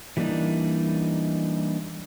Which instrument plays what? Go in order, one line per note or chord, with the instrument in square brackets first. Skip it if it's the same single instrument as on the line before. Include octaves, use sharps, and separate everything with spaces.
[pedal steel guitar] E3 G3 A#3 D4 D#4